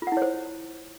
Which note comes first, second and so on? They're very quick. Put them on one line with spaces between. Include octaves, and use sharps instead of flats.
F4 F#5 E4 C#5 C5